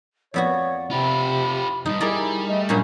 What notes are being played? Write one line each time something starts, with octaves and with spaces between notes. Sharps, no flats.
F2 B3 F#4 C#5 D5
C3 F4 G4 B5
E2 G2 D#4
G3 D#4 E4 G#4 A#4 D5
A3 D#5
G2 A#2 F#3 C#4 A#5